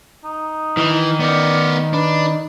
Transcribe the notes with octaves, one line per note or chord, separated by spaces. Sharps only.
D#4
D#3 E3
B3 A#4 D5
D4 B4